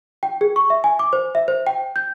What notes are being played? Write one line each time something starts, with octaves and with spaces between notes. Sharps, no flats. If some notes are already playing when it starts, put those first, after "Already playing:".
G5
G#4
C#6
E5
G#5
D6
C5
E5
C5
G5
G6